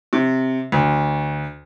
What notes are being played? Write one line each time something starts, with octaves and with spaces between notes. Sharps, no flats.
C3
D2